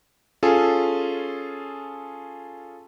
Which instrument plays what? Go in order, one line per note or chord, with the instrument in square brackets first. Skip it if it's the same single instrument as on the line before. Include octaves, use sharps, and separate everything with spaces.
[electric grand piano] C#4 F4 G#4 A4